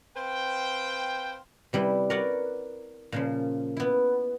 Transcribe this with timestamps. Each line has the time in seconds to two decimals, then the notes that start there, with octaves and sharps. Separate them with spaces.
0.16 C4 B4 C5 F5 G5
1.73 C3 G3 E4 B4
2.10 A#4 B4 C#5 D5 F#5
3.12 A#2 C#3 F3
3.77 B3 E4